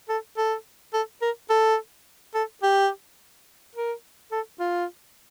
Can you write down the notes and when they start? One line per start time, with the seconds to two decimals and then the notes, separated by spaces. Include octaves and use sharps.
0.09 A4
0.37 A4
0.93 A4
1.22 A#4
1.50 A4
2.35 A4
2.63 G4
3.75 A#4
4.32 A4
4.60 F4